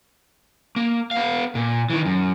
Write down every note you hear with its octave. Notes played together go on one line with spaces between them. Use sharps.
A#3
B3 F5
A#2
D#3 E3
F#2